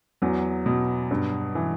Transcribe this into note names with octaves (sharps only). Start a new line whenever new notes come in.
E2 F#3
B2
G2
E3